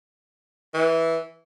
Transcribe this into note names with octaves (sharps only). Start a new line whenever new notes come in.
E3